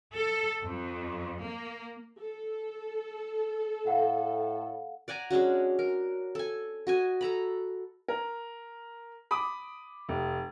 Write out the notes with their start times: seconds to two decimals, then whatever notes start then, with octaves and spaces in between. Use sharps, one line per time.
0.15 A4
0.64 F2
1.42 A#3
2.20 A4
3.87 A2 F5 F#5
5.08 D5 F#5 G#5 A#5
5.30 G#3 C#4 D4 F#4
5.79 A#4
6.35 A4 G#5
6.87 F#4 D#5 G#5
7.21 A4 A#5 B5
8.08 A#4
9.31 B5 D6 D#6
10.09 F1